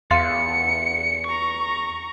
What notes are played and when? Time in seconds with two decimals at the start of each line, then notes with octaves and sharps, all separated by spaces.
0.11 E2 F5 C6 A6 C#7
1.27 A#5 C#6